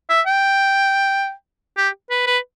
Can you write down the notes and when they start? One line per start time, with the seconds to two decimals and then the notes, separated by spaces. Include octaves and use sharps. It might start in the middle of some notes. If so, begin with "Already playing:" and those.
0.10 E5
0.27 G5
1.77 G4
2.11 B4
2.27 B4